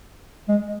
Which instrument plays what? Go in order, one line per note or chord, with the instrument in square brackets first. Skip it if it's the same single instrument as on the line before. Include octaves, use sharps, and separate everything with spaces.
[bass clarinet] G#3